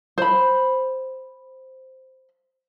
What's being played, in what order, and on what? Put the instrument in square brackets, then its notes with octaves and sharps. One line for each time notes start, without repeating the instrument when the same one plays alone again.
[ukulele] C5 B5